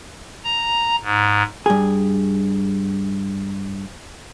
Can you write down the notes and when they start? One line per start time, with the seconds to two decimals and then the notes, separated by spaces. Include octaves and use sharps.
0.44 A#5
1.03 G#2
1.66 G2 G#4